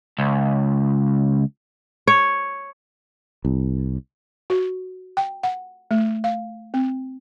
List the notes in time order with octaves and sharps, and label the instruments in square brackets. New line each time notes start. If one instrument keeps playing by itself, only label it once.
[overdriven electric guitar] C#2
[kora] C#5
[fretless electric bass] C2
[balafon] F#4
G5
F#5
A3
F5
C4